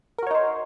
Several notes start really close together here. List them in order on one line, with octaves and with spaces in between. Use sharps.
A#4 F#4 C#5 D#4 C5